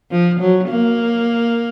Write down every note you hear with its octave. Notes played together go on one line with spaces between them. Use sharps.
F3
F#3
A#3